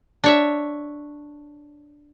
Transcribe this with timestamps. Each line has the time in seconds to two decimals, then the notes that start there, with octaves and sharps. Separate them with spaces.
0.24 D4 C#5 E5